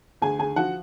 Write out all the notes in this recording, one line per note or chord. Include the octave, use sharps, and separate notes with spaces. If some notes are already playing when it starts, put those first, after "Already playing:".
D2 G#4 G#5
D3 G#4 G#5
F3 F#4 F#5